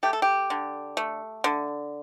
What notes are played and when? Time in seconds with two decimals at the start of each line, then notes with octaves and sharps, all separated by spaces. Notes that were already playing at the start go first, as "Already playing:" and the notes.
0.03 A3 G4
0.13 A4
0.22 G4
0.50 D3
0.97 A3
1.44 D3